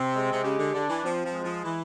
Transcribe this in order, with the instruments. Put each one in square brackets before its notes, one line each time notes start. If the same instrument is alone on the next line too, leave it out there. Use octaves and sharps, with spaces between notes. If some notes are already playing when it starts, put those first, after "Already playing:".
Already playing: [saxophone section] C3 [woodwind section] C4
[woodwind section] G#3
[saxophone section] C3
[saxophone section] C#3 [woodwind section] G4
[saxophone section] D3
[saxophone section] D3 [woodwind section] D4
[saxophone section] E3
[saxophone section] F3 [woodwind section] C4
[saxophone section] F3
[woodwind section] G#3
[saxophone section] F3
E3